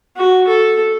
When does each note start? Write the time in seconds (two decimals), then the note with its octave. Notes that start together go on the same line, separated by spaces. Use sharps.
0.17 F#4
0.47 A4